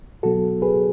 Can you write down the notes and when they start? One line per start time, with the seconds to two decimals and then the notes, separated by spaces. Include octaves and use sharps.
0.23 B2 F#3 B3 F#4 A4
0.62 G#4 B4